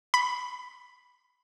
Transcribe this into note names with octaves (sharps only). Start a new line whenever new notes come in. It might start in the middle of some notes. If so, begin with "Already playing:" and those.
B5